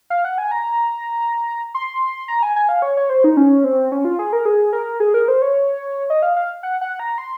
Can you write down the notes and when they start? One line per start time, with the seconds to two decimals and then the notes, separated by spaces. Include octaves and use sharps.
0.10 F5
0.25 F#5
0.38 G#5
0.51 A#5
1.74 C6
2.28 A#5
2.43 G#5
2.56 G#5
2.69 F5
2.82 C#5
2.97 C#5
3.09 C5
3.24 D#4
3.37 C#4
3.64 C4
3.92 C#4
4.05 F4
4.19 G#4
4.33 A#4
4.45 G#4
4.73 A#4
5.00 G#4
5.14 A#4
5.28 C5
5.42 C#5
6.10 D#5
6.22 F5
6.36 F5
6.63 F#5
6.81 F#5
7.00 A#5
7.18 C6